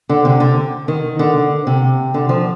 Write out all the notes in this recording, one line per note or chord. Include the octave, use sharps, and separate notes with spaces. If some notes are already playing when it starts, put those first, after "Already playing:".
D3
C3
D3
D#3
D3
C3
D3
F3